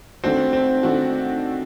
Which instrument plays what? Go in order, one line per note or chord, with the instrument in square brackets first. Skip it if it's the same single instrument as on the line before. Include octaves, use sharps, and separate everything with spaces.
[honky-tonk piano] D#3 A3 D4 F#4 [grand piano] C4
[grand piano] C4
[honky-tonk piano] D#3 A3 D4 F#4